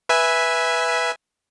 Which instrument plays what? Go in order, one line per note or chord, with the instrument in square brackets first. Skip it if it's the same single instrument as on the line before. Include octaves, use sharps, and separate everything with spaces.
[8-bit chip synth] B4 E5 G#5